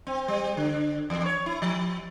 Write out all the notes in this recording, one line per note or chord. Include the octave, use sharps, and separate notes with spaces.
C4
G3
D3
E2
C#5
E4
F3